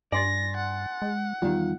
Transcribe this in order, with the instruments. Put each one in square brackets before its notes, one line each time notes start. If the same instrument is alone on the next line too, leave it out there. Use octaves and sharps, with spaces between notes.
[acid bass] G2 [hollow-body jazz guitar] D5 [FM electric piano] G#5 C6 A6 [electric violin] A#6
[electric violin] F#5
[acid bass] G#3
[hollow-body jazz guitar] E2 D#3 [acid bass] G3 [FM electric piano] F4